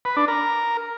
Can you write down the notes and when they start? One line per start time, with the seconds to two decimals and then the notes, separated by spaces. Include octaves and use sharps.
0.05 B4
0.17 D4
0.28 A#4